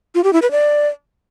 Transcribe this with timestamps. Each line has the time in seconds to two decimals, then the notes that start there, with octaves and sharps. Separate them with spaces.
0.15 F4
0.24 G4
0.33 E4
0.42 B4
0.51 D5